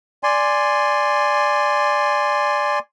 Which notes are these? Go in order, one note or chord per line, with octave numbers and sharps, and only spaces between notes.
D5 G#5 C6